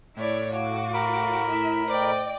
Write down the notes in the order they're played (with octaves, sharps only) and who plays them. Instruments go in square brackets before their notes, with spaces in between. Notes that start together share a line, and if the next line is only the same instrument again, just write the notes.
[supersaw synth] A2 [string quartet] E4 C#5 D5
[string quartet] F#4 D6 [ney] F5
[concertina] A#4 B5
[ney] E4 [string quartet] E5
[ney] C5 [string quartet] D5 D#5 G5